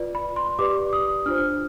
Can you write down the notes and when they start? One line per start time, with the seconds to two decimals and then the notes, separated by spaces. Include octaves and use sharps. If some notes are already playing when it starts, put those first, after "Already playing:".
Already playing: F4 B4 D5
0.15 B5
0.36 C6
0.59 G4 B4 D5 D6
0.93 D#6
1.26 D4 F4 C5 F6